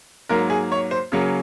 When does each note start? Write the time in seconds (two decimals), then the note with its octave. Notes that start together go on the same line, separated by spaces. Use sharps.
0.29 G#2 F#3 A#3 A#4
0.50 G#4
0.72 C#5
0.91 C5
1.12 C#3 F#3 A#3 C#4